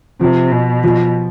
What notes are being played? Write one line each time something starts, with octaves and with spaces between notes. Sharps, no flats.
C3 F3
B2
F3